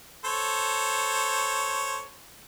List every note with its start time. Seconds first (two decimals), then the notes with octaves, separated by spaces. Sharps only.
0.25 A4 C5 C#5